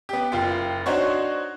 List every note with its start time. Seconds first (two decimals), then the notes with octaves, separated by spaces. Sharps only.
0.09 B3 G4
0.32 F#1 F4 G5
0.86 D4 D#4 F#4 C5 C#5